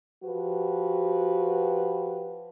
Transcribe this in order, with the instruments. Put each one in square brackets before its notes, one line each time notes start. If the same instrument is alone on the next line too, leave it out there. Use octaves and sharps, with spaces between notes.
[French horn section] F3 F#4 G4 B4